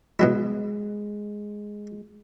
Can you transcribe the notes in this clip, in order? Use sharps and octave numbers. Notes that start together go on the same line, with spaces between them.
B2 F#3 G#3 E4